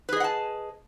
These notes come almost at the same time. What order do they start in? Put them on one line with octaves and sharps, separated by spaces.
B4 G#4 D#5 F#5 A5